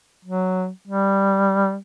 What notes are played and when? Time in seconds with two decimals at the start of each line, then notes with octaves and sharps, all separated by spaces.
0.24 F#3
0.87 G3